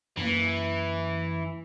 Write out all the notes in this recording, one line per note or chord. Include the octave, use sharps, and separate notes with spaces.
F#2 E3 A#3